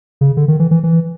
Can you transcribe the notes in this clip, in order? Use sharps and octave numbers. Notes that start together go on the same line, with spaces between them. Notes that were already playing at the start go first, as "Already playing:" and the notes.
C#3
D3
D#3
E3
E3
E3